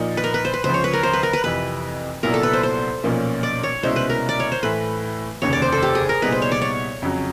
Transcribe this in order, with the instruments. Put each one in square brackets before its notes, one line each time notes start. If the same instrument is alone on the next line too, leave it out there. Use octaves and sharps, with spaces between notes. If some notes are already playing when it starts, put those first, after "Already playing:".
Already playing: [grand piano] A#2 F3 A#3 D#4
[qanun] B4
A#4
B4
C5
B4
[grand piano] C#2 C#3 F3 [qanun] C5
[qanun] C#5
B4
A#4
C5
B4
A#4
B4
[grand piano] F2 C3 E3 [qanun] B4
[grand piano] C2 A#2 F#3 B3 E4 [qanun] A#4
[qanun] A4
B4
C5
C5
[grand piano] B1 A#2 F3 A#3 C#4
[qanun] D5
C#5
[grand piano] C2 B2 G#3 C#4 E4 [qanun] C5
[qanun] B4
A#4
D5
C#5
C5
[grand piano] A2 E3 A3 [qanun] B4
[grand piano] F1 D#2 C#3 [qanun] C#5
[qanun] D5
C5
A4
G4
G#4
A#4
[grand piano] C2 A#2 G3 B3 D#4 [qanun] B4
[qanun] C5
C#5
D5
C#5
[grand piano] F2 C#3 F#3